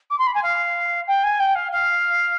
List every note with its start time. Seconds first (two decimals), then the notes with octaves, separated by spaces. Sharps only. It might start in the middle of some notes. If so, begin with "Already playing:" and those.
0.10 D6
0.18 C6
0.26 B5
0.34 G#5
0.42 F5
1.07 G5
1.23 G#5
1.39 G5
1.55 F5
1.72 F5